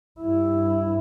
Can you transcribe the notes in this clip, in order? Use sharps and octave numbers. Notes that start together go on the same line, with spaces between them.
G2 E4